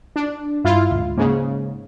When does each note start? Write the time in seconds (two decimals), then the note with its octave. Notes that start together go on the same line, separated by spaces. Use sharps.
0.16 D4
0.65 G2 E4 F4
0.91 D2 G#2
1.17 G#2 C#3 A#3